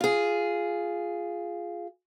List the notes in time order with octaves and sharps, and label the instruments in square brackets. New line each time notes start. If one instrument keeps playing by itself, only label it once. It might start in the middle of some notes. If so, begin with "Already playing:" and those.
[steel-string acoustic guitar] F4 G#4